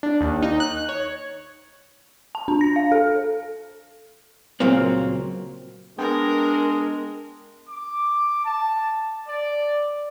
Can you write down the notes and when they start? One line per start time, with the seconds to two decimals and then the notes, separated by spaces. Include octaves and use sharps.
0.03 D4
0.21 D#2
0.42 D#4
0.60 F#6
0.89 C#5
2.35 A5
2.48 D4
2.61 A#6
2.76 F5
2.92 A4
4.60 C#2 A#2 F#3 A#3 C4
5.98 G#3 B3 D4 A#4 G5
7.69 D6
8.44 A5
9.27 D5